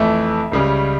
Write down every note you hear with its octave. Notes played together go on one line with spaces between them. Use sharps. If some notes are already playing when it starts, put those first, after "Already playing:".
Already playing: F2 E3 A3 E5
C#2 C#3 G3 C#4